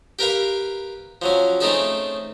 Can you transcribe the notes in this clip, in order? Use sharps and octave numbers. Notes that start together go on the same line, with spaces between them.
G4 A#4 B4 F5
F3 F#3 C#4
A3 C4 C#4 D#4 G#4 A4